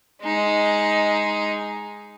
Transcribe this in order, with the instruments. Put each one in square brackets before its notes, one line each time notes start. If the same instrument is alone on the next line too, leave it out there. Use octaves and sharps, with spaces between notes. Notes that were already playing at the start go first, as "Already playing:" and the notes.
[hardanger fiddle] G#3 D#4